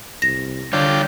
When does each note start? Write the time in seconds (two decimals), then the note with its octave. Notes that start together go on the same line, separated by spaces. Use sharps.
0.22 C2 A#6
0.73 D3 G3 D4 F4 C#5 G5